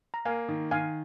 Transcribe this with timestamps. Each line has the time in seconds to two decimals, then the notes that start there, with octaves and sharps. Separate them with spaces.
0.14 A#5
0.25 A#3 F5 G#5
0.48 D#3
0.71 D#3 F5 G#5